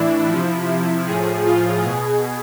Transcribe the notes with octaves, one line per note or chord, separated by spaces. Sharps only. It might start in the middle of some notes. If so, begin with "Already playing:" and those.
Already playing: A2 E3 D4 E4
C3 F3 E4
A2 F3 G#4
F4
B2 G#4